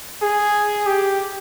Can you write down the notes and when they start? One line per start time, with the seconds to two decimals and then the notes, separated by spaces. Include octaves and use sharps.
0.23 G#4
0.87 G4